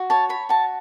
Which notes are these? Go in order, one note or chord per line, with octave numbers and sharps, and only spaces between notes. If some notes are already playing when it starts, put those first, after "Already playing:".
Already playing: F#4
C#5 A5
C#5 B5
F#4 A5